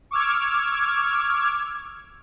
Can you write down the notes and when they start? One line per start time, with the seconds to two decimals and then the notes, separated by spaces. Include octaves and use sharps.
0.11 C#6 D6 E6 F6 G#6